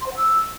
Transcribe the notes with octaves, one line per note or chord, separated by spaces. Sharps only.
C6
C5
F#5
E6